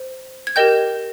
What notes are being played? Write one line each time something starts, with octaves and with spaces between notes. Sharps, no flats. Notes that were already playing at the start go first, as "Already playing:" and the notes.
Already playing: C5
G#6
G4 A#4 D#5 G5 G6